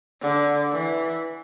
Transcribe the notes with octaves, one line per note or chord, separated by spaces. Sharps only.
D3
E3